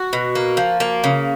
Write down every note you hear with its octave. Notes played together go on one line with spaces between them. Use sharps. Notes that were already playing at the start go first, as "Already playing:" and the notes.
Already playing: F#4
B2
A#3
F3
A#3
C#3